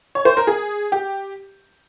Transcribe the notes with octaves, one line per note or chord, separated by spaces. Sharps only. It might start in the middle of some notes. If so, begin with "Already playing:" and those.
C#5
C5
A#4
G#4
G4